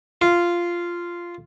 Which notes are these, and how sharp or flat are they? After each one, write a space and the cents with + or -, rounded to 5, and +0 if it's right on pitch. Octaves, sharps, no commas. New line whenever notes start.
F4 -10